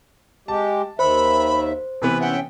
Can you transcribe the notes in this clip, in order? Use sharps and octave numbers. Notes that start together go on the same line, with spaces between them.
G#3 G4 A5
D#2 D#3 C5 E5 B5
C3 E3 B3 B4
C#4 E5 F#5 G5